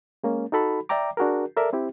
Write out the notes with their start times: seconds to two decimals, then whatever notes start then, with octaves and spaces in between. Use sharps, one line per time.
0.24 G#3 A#3 C#4
0.52 D#4 F#4 A4 B5
0.89 D5 E5 G5 A#5 D6
1.17 D4 F#4 G#4 A#4
1.57 A4 A#4 D5 E5
1.73 C4 E4 G4